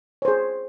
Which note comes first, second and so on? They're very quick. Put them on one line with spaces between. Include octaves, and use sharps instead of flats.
C#5 C5 G#4